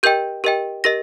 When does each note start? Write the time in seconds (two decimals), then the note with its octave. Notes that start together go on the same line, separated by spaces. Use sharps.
0.03 G4 A#4 D#5 G5 G6
0.44 G4 A#4 D#5 G5
0.84 G4 A#4 D#5 A#6